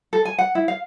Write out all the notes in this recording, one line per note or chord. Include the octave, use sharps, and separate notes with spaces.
A4
G#5
F#5
E4
F5